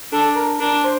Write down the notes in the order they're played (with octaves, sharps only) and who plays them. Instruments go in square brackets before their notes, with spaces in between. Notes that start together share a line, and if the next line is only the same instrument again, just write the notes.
[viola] D4 [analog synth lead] A4
[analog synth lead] A#4
[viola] D4 [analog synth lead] A#4
[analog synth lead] C5